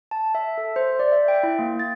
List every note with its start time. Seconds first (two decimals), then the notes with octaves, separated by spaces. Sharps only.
0.11 A5
0.35 E5
0.58 A4
0.76 C5
0.99 D5
1.12 E5
1.28 G5
1.43 E4
1.59 A#3
1.79 A6